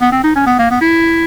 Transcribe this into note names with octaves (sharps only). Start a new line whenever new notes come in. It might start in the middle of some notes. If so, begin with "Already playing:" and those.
B3
C4
D#4
C#4
B3
A#3
B3
E4